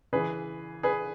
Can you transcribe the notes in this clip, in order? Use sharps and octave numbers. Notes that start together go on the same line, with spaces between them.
C#3 E3 G#4 B4
G#4 B4